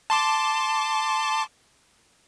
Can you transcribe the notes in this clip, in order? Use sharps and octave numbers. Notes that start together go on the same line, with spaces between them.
A5 C6 D6